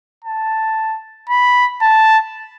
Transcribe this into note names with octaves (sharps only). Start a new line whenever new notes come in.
A5
B5
A5